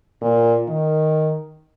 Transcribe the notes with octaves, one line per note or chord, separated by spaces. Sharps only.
A#2
D#3